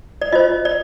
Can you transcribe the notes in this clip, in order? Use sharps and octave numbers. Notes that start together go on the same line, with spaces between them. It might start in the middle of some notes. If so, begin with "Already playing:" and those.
D5
F4 C5 D#5
D5